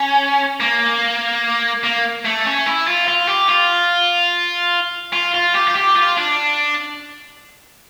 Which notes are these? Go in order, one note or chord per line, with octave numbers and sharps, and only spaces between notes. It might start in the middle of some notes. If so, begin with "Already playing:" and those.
Already playing: C#4
A#3
A#3
A3
C#4
E4
F4
F4
G4
F4
F4
F4
G4
F4
G4
F4
D4